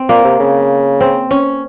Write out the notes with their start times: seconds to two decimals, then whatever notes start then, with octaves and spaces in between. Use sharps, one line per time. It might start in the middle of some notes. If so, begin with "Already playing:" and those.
Already playing: C4
0.09 A#2 A#3
0.24 C3
0.39 C#3
1.01 C4
1.31 C#4